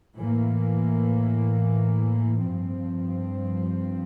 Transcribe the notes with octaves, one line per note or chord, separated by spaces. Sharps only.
A2 E3 A#3
G2 F3 C4